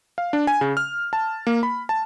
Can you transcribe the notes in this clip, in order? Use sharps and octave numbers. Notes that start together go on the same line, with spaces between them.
F5
D4
G#5
C#3
F6
A5
A#3
B5
A5